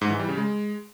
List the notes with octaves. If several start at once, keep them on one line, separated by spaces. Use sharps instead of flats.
G#2
E3
G3
C#3
G#3